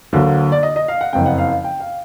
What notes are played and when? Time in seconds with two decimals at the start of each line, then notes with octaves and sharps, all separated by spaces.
0.13 D2 D3 F#3 A#3
0.52 D5
0.63 D#5
0.76 D#5
0.88 F5
1.01 F#5
1.13 F#1 F2 C#3 G5
1.26 F#5
1.38 F5
1.64 G5
1.80 F5